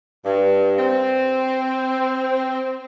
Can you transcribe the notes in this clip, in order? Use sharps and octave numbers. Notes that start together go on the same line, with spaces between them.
G2
C4